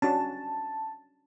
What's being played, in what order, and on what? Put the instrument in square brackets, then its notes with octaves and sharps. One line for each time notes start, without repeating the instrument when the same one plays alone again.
[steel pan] C#4 D4 F#4 [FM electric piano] A5